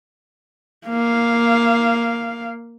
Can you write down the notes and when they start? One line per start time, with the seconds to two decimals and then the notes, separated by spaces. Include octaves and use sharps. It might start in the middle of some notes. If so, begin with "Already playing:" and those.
0.87 A#3 F5